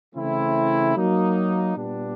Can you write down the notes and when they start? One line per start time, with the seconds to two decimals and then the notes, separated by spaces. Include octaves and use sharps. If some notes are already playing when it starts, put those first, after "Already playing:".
0.15 C#3 E3 A3 C4 E4
0.95 F#3 A#3 D#4
1.76 A#2 G3 B3 D4